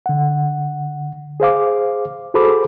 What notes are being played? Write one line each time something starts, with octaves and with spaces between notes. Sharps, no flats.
D3 F#5
G#4 C5 F5 D6
F#4 G#4 A4 C5 B5 D6